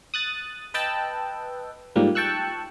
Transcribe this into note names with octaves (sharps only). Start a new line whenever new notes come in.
D#6 F#6 A6
B4 D#5 G5 A5 E6 F#6
G#2 F3 G3 A#3
G5 A5 C#6 E6 F#6